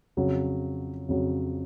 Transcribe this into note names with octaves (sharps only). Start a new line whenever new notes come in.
F2 C#3 F#3
F2 C#3 F#3